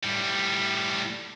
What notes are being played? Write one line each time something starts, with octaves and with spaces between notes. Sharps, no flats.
A2 G3